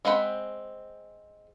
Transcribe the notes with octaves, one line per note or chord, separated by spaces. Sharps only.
G#3 C4 C5 F#5 B5